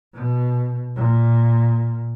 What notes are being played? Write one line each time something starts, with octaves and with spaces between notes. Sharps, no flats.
B2
A#2